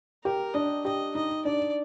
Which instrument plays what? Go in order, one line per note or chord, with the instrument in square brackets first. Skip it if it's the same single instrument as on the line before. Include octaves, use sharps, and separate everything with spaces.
[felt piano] G4 [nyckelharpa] A#4
[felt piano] D4 [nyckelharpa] D#5
[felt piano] G4 [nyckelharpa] D#5
[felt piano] D#4 [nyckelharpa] D#5
[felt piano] D4 [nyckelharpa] D5